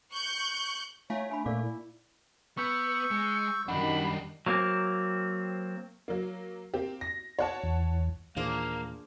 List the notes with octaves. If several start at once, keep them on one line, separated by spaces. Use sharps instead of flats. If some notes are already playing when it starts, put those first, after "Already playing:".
C#6 F#6 G6
A3 E4 C#5 F5 G#5
D4 G#5 B5
A#2 A4 D5 F5 D6
E4
B3 C#6 E6 G6 C#7
G#3
F#2 D#3 G3 D4 D#4 F#5 B5
F#3 A#3 C4
F#3 A#3
A#3 C4 G4
A#6
C#5 F#5 A5
E2
D#2 A#2 E3 A#3 D4 G#4 C5 F5